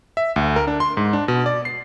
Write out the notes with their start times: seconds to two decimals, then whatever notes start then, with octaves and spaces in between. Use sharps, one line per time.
0.17 E5
0.36 D2
0.56 A#4
0.67 D4
0.80 C6
0.97 G#2
1.13 D4
1.28 B2
1.46 D5
1.65 C7